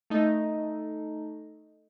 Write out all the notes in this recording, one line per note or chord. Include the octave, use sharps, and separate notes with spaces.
A3 D#4